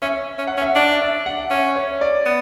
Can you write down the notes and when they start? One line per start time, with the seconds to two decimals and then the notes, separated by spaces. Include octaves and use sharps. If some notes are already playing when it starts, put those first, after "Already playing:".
0.02 C#4 E5
0.38 C#4
0.47 F#5
0.57 C#4
0.62 E5
0.76 D4 D5
1.01 E5
1.26 F#5
1.50 C#4 E5
1.76 C#5
2.01 D5
2.26 B3